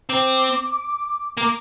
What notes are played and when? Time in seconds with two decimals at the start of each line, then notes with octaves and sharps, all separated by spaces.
0.09 C4 D6
1.37 A#3 D6